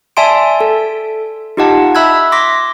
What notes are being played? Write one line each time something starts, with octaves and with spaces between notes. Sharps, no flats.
D5 E5 G#5 A5 C6 D7
A4
D#4 F4 G4 D#5 F#5 A5
E5 B5 E6 F#6 G#6
C6 D6 A#6 B6